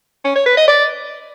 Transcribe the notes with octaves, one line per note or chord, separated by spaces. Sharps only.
C#4
C#5
B4
D#5
D5